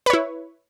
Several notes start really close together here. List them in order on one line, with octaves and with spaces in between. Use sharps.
B4 C#5 E4